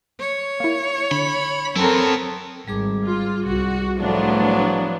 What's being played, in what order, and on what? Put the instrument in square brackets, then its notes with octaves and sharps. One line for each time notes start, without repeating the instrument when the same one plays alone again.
[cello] C#5
[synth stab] A#3 E4
[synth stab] D3 [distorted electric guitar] B5
[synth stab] F#2 [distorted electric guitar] B3 E4 [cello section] C4 A4 A#4
[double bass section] G#1 [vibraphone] G3 G#4 D6
[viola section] F4
[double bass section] C2 [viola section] F#4
[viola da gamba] A2 F3 F#3 [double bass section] A3 [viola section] B3 D4